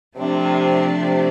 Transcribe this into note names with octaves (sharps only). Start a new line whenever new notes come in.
C3 F3 A3 D4
C3